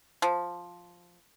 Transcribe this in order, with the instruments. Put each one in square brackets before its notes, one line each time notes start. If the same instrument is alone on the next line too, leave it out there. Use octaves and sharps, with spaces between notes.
[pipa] F3